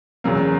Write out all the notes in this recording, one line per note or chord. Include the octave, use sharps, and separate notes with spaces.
E2 C#3 F#3 A#3